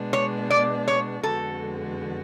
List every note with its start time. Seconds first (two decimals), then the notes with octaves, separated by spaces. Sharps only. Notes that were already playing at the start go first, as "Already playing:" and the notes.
Already playing: B2 G#3 B3 D4
0.13 C#5
0.50 D5
0.88 C#5
1.23 F2 D3 G#3 B3 F#4 A4